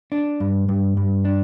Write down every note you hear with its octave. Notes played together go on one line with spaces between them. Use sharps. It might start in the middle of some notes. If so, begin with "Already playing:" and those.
D4
G2
G2
G2
D4